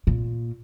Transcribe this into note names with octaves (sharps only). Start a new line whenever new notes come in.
A#2